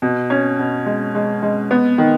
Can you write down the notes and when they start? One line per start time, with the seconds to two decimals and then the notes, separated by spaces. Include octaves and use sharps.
0.02 B2
0.30 C#4
0.59 B2
0.86 G#3
1.15 G#3
1.42 G#3
1.71 B3
1.98 D#3